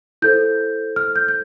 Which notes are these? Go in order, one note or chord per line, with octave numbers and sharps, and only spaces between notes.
E4 A4 C5 G6
F6
G6
G6